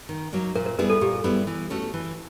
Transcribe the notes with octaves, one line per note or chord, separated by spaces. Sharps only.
D#3
F#3 A#3 D#4
A#2 A#4
A#4
G3 B3 E4 G#4 A#4
A4
A#2 G4
G3 B3 E4 G#4
E3
A3 C#4 F#4 A4
E3